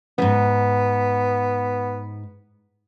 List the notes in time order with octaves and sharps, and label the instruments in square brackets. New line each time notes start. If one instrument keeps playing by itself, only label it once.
[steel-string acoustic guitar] E2 G#2 [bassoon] B3